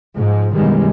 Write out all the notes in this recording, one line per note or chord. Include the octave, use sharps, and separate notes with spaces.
G#2 F3 G#3
F#2 B2 D#3 E3 G3 G#3